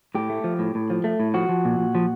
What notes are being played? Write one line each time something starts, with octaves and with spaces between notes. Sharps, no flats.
A2 G4
A3
F3
A2
A2
F3
A3
A2
F3 F#4
F3
A#2
A#2
F3